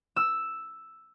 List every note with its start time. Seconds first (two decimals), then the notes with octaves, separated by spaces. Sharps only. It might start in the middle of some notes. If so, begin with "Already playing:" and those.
0.16 E6